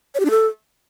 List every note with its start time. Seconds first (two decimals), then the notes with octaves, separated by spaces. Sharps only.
0.15 C#5
0.20 G4
0.25 D4
0.30 A4